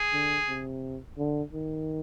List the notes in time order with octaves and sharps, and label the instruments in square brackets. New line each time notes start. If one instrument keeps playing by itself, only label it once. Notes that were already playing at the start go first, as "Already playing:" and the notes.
Already playing: [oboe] G#4
[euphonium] D3
C3
D3
D#3